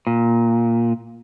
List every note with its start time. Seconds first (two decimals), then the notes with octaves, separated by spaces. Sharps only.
0.07 A#2